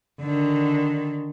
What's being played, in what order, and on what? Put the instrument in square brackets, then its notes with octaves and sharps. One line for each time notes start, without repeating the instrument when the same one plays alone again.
[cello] D3 D#3